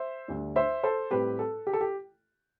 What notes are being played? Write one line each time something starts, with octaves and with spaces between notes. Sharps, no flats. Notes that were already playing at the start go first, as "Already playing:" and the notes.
Already playing: C5 E5
D2 D3 G3 D4
C5 E5
A4 C5
A2 G3 C4 G4 B4
A4
G4
A4
G4